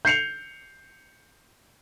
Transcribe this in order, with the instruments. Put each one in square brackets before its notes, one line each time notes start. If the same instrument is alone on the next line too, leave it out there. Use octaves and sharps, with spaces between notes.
[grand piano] G6 C7 C#7 F7